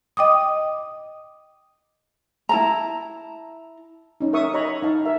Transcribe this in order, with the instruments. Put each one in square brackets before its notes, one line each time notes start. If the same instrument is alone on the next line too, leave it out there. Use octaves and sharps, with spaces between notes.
[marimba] D#5 G5 D6 D#6
[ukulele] E4 A5 A#5
[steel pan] C#4 D#4
A#4 E5 C#6 D#6
C#5 D#5 A#5 B5 C#6
D#4 F5 A5
A#4 E5 F5